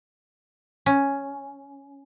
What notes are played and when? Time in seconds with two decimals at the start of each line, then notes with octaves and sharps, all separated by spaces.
0.86 C#4